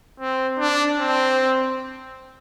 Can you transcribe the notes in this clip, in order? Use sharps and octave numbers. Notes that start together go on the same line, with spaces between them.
C4
D4
C4